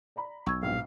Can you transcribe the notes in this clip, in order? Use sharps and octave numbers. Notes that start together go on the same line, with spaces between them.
D5 A#5 B5
B1 C#6 E6 G#6
A#1 G#2 B2 F5